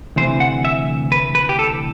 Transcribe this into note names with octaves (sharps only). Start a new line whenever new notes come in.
D2 C3 E3 C5
F#5
E5
B4
B4
G4
A4